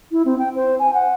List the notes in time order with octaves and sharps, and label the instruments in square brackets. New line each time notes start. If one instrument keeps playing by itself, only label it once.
[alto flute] E4
C4
G5
C5
G#5
F#5